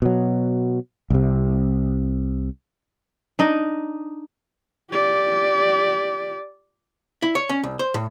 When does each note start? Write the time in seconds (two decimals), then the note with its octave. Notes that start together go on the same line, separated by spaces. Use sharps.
0.02 B2 F#3
1.10 C2 C3
3.39 D4 D#4 D#5
4.91 G4 D5
7.22 E4
7.35 C#5
7.49 C#4
7.64 C2
7.79 C5
7.94 A2